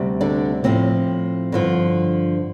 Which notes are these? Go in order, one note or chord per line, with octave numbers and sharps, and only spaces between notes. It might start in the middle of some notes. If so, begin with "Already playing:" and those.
Already playing: D2 C3 G3
D3 D4
A2 F3 C4
G2 D3 F3